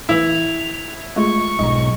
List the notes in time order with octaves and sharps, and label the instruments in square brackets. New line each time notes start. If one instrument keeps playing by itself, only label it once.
[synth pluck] A2 E3 [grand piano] E4 [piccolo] F7
[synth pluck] G#3 A3 F4 [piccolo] C#6
[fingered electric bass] B1 G#2 [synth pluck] D#5 A#5